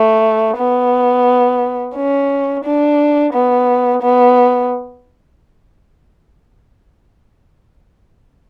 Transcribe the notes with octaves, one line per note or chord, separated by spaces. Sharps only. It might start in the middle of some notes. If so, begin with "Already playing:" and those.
Already playing: A3
B3
C#4
D4
B3
B3